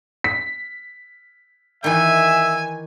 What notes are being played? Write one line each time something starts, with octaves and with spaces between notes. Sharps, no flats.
B6
D#3 E3 E5 G#5